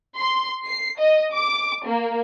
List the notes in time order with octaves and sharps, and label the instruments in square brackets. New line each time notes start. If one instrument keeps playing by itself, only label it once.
[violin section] C6
C7
D#5
D6
A#3